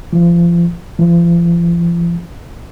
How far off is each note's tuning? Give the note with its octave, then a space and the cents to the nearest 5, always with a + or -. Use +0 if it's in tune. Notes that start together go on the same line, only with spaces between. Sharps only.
F3 -30
F3 -40